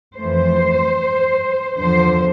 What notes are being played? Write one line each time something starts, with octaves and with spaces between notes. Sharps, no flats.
F2 E3 A3 C5
E2 D3 F3 C5